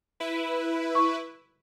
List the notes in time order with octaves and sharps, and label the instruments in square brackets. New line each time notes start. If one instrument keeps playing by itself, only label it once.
[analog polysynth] E4 B4
[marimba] C#6